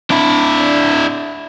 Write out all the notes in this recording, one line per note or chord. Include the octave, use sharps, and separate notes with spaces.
D4 E4